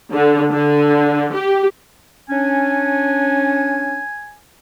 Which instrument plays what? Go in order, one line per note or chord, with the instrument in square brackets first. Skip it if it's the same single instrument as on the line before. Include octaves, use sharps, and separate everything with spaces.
[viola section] D3
D3
G4
[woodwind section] C#4 D4 [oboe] G#5